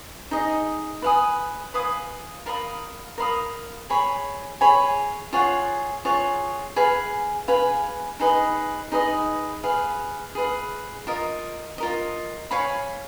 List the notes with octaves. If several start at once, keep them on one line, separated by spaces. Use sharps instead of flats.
D#4 G#4 D#5
B4 F5 G#5 D#6
B4 F5 G#5 D#6
A#4 F5 B5 D#6
A#4 F5 B5 D#6
G#4 C#5 G#5 B5
G#4 C#5 G#5 B5
F4 G#4 C#5 F#5
F4 G#4 C#5 F#5
G#4 B4 F5 G#5
G#4 B4 F5 G#5
D#4 G#4 B4 D#5
D#4 G#4 B4 D#5
G#4 B4 F5
G#4 B4 F5
F4 A#4 D#5
F4 A#4 D#5
C#5 F5 G#5 B5